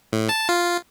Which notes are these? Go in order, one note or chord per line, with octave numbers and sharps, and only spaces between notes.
A2
A5
F4